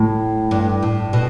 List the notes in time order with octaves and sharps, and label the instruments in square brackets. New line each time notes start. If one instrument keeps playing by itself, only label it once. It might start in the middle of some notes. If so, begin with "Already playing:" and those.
Already playing: [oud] A2
G2
A2
B2